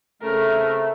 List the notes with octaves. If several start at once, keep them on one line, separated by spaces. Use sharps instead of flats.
C#3 A3 C4 A4 A#4